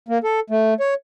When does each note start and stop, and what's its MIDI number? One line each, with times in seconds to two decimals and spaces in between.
0.08 0.18 58
0.24 0.40 69
0.50 0.74 57
0.80 0.94 73